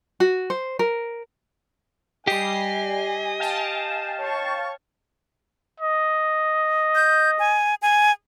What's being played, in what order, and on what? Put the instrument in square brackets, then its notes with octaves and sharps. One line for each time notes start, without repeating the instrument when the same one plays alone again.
[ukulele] F#4
C5
A#4
[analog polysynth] G3 C7 [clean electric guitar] G4 [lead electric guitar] D#5 [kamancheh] G#5
[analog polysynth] F5 G5 A5
[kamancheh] C#5 C#6
[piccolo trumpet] D#5
[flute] G6
G#5
G#5